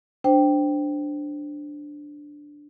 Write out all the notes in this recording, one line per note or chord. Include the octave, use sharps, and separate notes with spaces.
D4 C5 G5